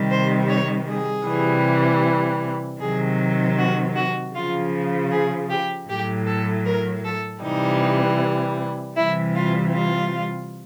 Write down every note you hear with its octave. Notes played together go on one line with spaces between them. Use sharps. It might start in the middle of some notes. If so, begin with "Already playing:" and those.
Already playing: C3 D#3 G3
C5
C#5
G#4
C3 E3 G3
C3 D#3 F#3 G#4
F#4
F#4
C#3 F3 F4
G#4
G4
A2 F#3 G4
A4
A#4
A4
C3 E3 G3 D#4
C3 E3 G3 E4
F4
F4